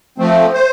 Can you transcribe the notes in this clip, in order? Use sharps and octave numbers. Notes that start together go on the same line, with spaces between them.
F3 A3 C4
C5